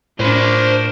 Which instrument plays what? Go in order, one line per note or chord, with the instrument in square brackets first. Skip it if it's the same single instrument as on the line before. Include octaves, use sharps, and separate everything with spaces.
[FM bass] A2 [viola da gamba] D4 F4 A#4 [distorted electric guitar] C5 B5